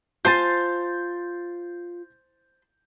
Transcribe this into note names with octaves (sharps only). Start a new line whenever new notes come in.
F4 C5 G#5 A5 C6 G6 A6